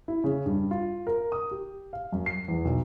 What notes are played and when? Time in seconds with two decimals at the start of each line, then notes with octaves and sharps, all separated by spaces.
0.08 E4
0.24 C#3
0.46 G2
0.71 F4
1.07 A#4
1.32 D#6
1.51 G4
1.93 F5
2.12 F#2
2.26 C7
2.48 E2
2.65 B1